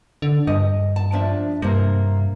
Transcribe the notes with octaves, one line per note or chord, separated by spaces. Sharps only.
D3
G2 D#5
A5
F3 D4 E5
G2 C3 A#3